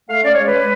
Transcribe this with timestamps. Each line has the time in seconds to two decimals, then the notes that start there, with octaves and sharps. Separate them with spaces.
0.09 A3 F5
0.24 C#4 D5
0.33 C#5
0.38 G#3
0.44 B4
0.54 G#3